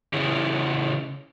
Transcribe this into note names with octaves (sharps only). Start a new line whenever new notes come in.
C#3 E3 C#4 E4 G#4